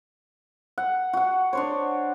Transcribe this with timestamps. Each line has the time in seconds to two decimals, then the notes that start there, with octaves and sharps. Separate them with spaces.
0.78 F#5
1.13 F#4 F#5
1.53 D4 C5 C#5